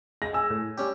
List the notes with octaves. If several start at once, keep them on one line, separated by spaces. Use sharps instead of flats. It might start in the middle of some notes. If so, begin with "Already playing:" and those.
G#3 A#6
G#5 E6
A2
G3 C#4 G4